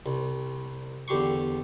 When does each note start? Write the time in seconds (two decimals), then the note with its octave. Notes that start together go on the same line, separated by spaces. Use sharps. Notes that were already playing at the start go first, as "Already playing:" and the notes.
0.06 C2
1.08 E2 D3 G4 C6 C#6